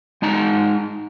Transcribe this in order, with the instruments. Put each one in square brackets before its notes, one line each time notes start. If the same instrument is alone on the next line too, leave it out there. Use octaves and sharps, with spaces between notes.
[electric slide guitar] G#3 D#4 A5 A#5